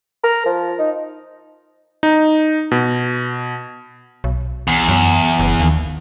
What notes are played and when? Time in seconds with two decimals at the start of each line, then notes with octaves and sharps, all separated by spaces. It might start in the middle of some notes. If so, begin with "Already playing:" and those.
0.23 A#4
0.45 F3
0.79 D#4
2.03 D#4
2.71 B2
4.24 B1
4.67 E2
4.89 F#2
5.39 F#1
5.60 D#2